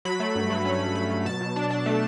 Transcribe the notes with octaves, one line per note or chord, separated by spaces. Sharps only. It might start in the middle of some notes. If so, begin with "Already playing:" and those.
F#3 B5
A3
G2
F#3
C#4
F#3
F#3 B5
F#3
B2 A5
B2
D4
D4
A3